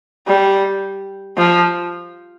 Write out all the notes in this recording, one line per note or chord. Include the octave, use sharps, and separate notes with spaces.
G3
F3